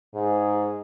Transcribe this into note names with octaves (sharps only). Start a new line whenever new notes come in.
G#2 G#4